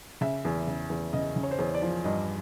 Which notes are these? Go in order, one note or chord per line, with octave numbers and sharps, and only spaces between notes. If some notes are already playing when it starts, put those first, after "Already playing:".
C#3 E5
E2
C#3
E2
C#3 D#5
C#3
C#5
C5
E2 C#5
D5
F3
G2 D#5